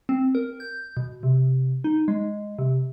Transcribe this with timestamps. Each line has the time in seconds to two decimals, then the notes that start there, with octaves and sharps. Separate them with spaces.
0.09 C4
0.35 A#4
0.60 G6
0.97 B2
1.23 C3
1.84 D#4
2.08 G#3
2.59 C3